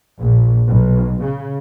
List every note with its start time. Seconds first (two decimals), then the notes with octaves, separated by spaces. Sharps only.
0.19 A#1
0.68 B1
1.24 C#3